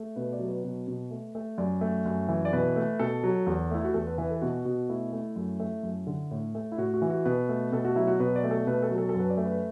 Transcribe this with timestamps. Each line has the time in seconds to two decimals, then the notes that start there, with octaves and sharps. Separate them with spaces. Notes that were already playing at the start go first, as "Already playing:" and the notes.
Already playing: A3
0.16 B2 B4
0.32 D5
0.39 F#3
0.48 B4
0.64 B2
0.88 B2
1.11 A3
1.35 A3
1.58 F#2 D5
1.81 A3
2.06 F#2
2.28 E3
2.45 D5
2.53 B2 B4
2.76 A3
2.99 B2 A4
3.24 F#3
3.47 E2
3.71 A3 E4
3.84 F#4
3.94 E2 A4
4.07 B4
4.18 E3 B4
4.30 A4
4.42 B2 F#4
4.65 B2
4.89 A3 E4
5.12 A3
5.36 F#2
5.60 A3
5.83 F#2
6.07 D3
6.31 A2
6.55 A3
6.72 E4
6.78 A2 F#4
6.94 F#4
7.02 E3
7.10 F#4
7.25 B2 B4
7.49 A3
7.72 B2 A4
7.85 F#4
7.96 F#3 E4
8.07 F#4
8.20 B2 B4
8.36 D5
8.44 A3
8.51 A4
8.67 B2 B4
8.82 A4
8.91 F#3
8.98 A4
9.09 A4
9.15 F#2 B4
9.30 D5
9.37 A3
9.45 B4